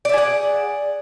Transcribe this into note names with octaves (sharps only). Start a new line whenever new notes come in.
G#4 D5 E5 F#5